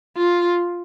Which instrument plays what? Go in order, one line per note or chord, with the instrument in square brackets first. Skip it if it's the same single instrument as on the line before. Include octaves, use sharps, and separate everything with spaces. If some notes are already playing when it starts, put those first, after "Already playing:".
[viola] F4